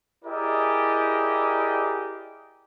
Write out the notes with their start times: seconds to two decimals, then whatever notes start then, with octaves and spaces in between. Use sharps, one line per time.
0.24 E4 G4 G#4 A#4 D5 D#5